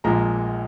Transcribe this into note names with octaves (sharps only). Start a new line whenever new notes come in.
A#1 A#2 F3 G#3 A#5